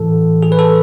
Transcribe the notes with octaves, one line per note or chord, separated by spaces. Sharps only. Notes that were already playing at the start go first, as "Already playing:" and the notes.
Already playing: A2 E3 A4
G#4
B4
A4